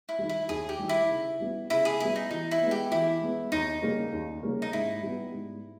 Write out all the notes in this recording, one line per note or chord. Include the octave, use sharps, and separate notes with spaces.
E4
D#3 G3
E4
D#2 G#4
G4
D#3 G3
E4
C#3
G3 B3
C#3 E4
G#4
G3 B3 E4
D#4
E3 D#4
E4
G#3 B3
G4
E3 E4
G#3 B3
D#2 D#4
C#3 G3 A#3 C#4
D#2
C#3 G3 A#3 C#4
D#4
G#2 E4
G3 B3
G#2